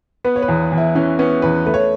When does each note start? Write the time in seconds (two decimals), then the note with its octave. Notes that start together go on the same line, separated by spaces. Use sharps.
0.24 B3 B4
0.36 C#5
0.42 B4
0.48 E2
0.72 E2
0.78 E4
0.95 E3 C#4
1.19 B3 C#4
1.42 E2 B4
1.66 A3 B4
1.74 C#5